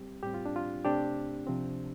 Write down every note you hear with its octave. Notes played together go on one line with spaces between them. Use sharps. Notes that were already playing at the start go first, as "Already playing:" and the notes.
Already playing: G3 C4 G4
A2 G3 C4 G4
F4
D4
F4
C3 A3 C4 D4 G4
C3 F3 C4